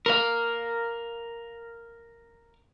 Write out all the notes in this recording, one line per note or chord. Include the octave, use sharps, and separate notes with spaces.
A#4 F5